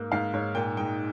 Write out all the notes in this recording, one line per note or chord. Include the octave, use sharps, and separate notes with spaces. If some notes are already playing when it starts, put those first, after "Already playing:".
Already playing: G#2 A#3
G#2 F5
G#2 C#5
A#2 G5
G#3 G5